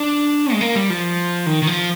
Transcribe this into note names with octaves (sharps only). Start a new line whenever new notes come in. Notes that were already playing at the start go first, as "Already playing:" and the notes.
Already playing: D4
G#3
A#3
G3
F3
D#3
D#3
F3